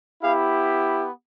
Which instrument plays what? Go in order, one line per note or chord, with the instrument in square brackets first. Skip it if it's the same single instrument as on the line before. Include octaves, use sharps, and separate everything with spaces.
[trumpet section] B3 E4 G4 F5